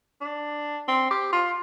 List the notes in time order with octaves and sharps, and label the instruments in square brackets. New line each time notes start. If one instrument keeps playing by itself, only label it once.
[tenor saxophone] D4
C4
G4
F4